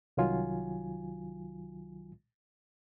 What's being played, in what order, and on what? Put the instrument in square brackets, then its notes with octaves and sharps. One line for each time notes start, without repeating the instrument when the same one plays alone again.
[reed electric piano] C2 D#3 F#3 F4 G#5